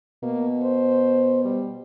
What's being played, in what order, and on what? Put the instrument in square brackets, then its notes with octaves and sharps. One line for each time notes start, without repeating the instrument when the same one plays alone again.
[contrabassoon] B2 [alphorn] A#3
[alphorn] C5
G3